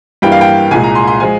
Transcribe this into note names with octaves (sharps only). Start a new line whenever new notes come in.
G2 E3 G3 A#3 G5
F5
G5
C2 A#2 G#3 G#5
A#5
C6
C6
F3 G#3 G#5